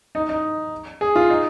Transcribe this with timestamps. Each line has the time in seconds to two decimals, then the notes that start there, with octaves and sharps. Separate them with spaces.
0.15 D#4
0.29 D#4
1.01 G#4
1.16 F4
1.30 D#4